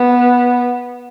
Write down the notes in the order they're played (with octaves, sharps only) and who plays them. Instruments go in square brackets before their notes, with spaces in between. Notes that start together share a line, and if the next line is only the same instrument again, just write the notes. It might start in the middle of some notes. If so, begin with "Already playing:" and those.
Already playing: [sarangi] B3